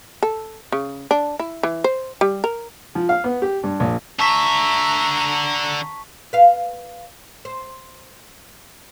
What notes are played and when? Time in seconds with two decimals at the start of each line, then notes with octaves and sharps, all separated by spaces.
0.23 A4
0.72 C#3
1.11 D4
1.40 E4
1.63 E3
1.84 C5
2.21 G3
2.44 A#4
2.95 F3
3.09 F5
3.24 B3
3.42 G4
3.63 G2
3.80 A#1
4.19 D3 E5 A5 A#5 C#6 B6
6.33 B4 F5
7.45 C5